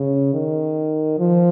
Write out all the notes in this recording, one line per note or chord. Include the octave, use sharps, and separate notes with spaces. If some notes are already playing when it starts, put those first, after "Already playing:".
Already playing: C#3
D#3
F3